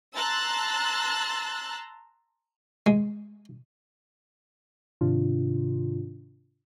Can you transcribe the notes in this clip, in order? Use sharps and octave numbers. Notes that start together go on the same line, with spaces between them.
A5 A#5 C6 E6 F#6 A6
G#3
G#2 C3 D#3 D4 F4